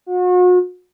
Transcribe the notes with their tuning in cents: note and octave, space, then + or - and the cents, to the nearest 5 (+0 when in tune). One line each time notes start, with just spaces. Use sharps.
F#4 -40